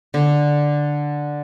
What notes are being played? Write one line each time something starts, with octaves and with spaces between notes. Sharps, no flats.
D3